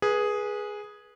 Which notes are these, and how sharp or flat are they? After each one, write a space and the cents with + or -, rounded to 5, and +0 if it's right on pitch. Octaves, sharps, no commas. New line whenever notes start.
G#4 +0 B4 -25